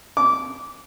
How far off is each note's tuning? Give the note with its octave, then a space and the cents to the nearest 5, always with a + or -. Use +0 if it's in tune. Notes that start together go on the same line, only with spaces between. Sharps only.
D6 -20